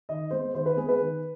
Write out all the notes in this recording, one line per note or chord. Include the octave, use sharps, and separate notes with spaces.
D#3 D#5
G#3 B3 C5
D#3 C5
B4
G#3 B3 G#4
B4
D#3